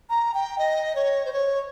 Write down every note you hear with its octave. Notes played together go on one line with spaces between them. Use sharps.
A#5
G5
D#5
C#5
C5
C#5